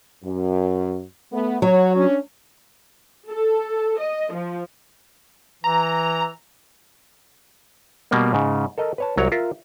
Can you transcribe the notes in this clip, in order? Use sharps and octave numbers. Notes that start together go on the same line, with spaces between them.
F#2
A3 B3
F#3 F#4 C#5
C#4 D4
A4
D#5
F3
E3 A#5
B2 G3 A#3
G#2 C#3
A4 A#4 D#5
B4 C#5 A5
C2 F#3 C#5 A#5
F4 A#4 E5